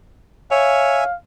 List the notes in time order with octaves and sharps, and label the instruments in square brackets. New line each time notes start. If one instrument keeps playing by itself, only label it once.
[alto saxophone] C#5 [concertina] E5 G#5 [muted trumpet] F5